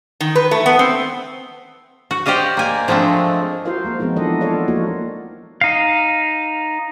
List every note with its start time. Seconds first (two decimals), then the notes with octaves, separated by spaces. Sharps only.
0.20 D#3
0.35 B4
0.51 A3
0.66 B3
0.79 C4
2.11 F#4
2.26 G4 C5 D5 D#5 F5
2.57 A#3 G#5
2.88 F3 G#3 A3 C4 D4
3.65 F4 F#4 A#4 C5 F5
3.84 G#3 A#3 A#4
3.99 F3 G#3 B3 C4 D#4
4.16 E3 D4 A4 D#5 F#5
4.41 F4 A4 C#5 D5 F5
4.68 F3 A3 A#3 D#4 F4 F#4
5.61 D#4 F5